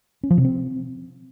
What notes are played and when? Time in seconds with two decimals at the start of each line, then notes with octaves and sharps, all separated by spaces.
0.23 C#4
0.30 F3
0.38 C3
0.45 C4